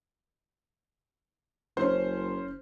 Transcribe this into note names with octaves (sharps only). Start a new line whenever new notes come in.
F#1 C#4 C5